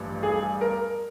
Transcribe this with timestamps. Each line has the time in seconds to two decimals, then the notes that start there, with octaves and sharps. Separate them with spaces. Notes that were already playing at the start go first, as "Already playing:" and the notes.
Already playing: A1 G2 F3
0.23 G#4
0.61 A#4